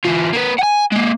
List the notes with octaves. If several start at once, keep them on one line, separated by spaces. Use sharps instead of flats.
E3 F4
A#3 B4
F#5 G#5
G#3 A#3